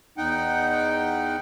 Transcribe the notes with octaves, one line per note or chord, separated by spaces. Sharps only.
E2 D#4 F#5 G5